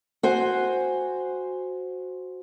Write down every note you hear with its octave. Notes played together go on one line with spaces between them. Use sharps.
F#4 C5 G#5